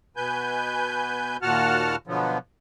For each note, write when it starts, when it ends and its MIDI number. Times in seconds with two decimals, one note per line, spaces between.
0.17 1.37 47
0.17 1.37 71
0.17 1.37 80
0.17 1.37 91
1.42 1.96 39
1.42 1.96 46
1.42 1.96 66
1.42 1.96 78
1.42 1.96 81
1.42 1.96 89
2.07 2.38 47
2.07 2.38 50
2.07 2.38 53
2.07 2.38 54
2.07 2.38 59